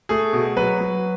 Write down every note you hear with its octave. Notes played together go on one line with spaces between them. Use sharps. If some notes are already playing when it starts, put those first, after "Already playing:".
A3 G#4
B2
F#3 B4
F#3